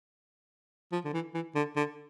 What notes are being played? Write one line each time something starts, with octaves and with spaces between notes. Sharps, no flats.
F3
D3
E3
E3
D3
D3